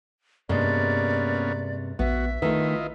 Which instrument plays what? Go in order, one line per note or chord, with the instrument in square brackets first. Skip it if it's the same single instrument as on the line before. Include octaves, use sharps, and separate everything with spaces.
[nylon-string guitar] G2 C3 G#3 [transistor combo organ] A#3 B3 C#4 [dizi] D5
[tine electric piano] A#1 [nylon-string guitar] B3 [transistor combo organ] F#4 [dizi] E5
[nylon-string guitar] D#3 A3 [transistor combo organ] E4 F4 D#5 [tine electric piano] B4